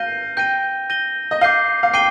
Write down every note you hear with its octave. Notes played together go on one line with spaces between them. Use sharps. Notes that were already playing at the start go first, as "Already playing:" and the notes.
Already playing: F5 G6 A#6 D#7 G7
G5 G6 A#6 D#7 G7
G6 A#6 D#7 G7
D#5
F5 D6 G6 C7 D#7 G7
F5
G5 D6 G6 C7 D#7 G7